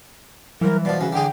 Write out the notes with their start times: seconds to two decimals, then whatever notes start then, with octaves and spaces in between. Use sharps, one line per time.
0.61 E3 F#3 G3 A#4
0.85 B2 F3 D5
1.01 C#3 F#4
1.13 D3 G#4 G5